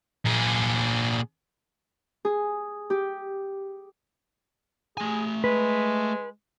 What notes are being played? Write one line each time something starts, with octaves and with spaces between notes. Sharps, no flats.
A#2 G#4
G#4
G4
A3 G#4 G#5
G#3 B4